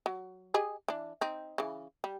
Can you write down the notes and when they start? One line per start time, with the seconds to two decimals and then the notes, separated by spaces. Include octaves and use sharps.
0.06 F#3
0.54 G4 G#4 D#5
0.88 E3 D4
1.21 C4 D#4
1.58 C#3 E3
2.04 G3